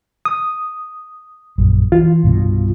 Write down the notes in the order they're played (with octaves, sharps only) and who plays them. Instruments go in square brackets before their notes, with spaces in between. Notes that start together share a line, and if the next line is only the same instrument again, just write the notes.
[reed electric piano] D#6
[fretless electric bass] A#1 F#2
[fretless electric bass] E3 [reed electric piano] F4
[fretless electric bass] C2 G2 B2